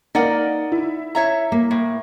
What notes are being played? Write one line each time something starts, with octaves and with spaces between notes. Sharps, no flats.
A#3 D#4 A#4 D5 F#5
E4
C#5 E5 A#5
A#3
A2